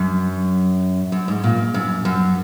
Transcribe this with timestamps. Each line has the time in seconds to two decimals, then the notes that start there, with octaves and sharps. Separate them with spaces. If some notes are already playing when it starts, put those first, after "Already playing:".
Already playing: F#2
1.12 F#2
1.28 G#2
1.44 A#2
1.74 F#2
2.05 F#2